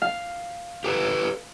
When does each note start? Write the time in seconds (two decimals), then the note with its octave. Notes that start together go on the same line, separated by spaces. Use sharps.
0.02 F5
0.84 G4 A4 B4